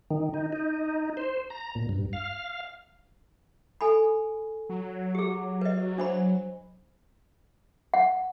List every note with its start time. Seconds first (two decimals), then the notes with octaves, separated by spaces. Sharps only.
0.11 D#3
0.34 D#4
0.52 D#4
1.17 C5
1.50 A#5
1.75 A#2
1.89 G2
2.13 F5
3.81 A4 G#5 B5
4.69 F#3
5.15 G4 G#4
5.61 B4 D#5
5.98 D4 C5 B5
7.94 F#5